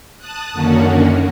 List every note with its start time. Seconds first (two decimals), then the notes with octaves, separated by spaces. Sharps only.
0.18 A5 D#6 F#6
0.52 F#2 D3 D#3 A#3 C#4 F#4